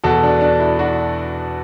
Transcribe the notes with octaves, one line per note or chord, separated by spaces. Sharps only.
E2 B2 F#4 A4
D4
D4
E4
D4 F#4